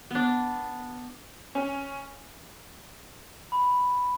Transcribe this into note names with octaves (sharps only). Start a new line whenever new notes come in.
B3 D4
C#4
B5